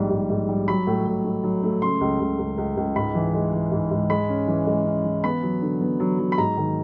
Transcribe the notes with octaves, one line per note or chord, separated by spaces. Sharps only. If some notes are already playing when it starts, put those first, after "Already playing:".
Already playing: A#1 G#2 G3
G#2
G#2
G3
F#3 B5
A2
A2
A3
F#3
A3
C#3 C6
C#2
C#2
C#2
C#2
C#2
G#2 B5
E3
G#3
E3
G#2
G#2
G#3 B5
C#4
E3
G#3
C#4
E3
B3 B5
F#3
D3
B3
F#3
F#3
B5
G#2 A#5
D#3